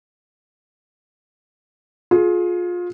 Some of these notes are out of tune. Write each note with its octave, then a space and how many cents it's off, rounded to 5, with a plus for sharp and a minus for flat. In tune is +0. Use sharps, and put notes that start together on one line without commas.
F4 +25 G#4 +30